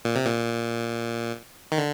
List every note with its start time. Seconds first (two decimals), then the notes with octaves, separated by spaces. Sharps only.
0.05 A#2
0.15 C3
0.26 A#2
1.72 D#3
1.78 D3